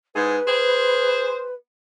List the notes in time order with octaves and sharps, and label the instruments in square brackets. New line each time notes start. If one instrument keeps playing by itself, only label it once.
[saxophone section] G#2 E4 G#4 [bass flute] B4
[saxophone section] G#4 C5